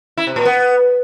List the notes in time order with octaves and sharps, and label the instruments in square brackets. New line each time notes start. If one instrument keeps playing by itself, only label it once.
[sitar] E4
C3
A#2
B3